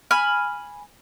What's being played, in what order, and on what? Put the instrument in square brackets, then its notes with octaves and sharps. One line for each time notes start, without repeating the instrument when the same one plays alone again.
[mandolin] G#5 B5 F6